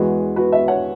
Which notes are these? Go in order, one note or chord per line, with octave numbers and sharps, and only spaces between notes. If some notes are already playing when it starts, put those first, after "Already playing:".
Already playing: E2 E3 G#3 F#4 B4
F#4 B4
B4 E5
C#5 F#5